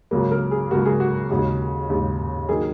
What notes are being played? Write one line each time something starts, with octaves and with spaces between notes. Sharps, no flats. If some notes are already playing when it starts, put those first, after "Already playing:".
C#2 C#3 F#3 A#3
A#4
G#4
C#2 C#3 F#3 A#3 F#4
G#4
F#4
D#2 C#3 G#3 F#4
D#2 C#3 G#3
D#3 F#3 A#3 G#4